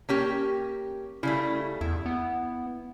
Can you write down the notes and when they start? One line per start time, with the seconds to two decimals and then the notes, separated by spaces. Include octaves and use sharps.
0.09 A#3 C#4 G4
1.23 C#3 G3 A3 E4
1.81 E2 E4
2.06 B3